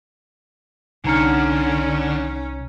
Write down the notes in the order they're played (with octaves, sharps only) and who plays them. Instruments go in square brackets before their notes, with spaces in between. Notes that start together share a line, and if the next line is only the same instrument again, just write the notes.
[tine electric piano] C2 A#5 C#7 [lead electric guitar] D3 [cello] C#4 [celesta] D#4 F6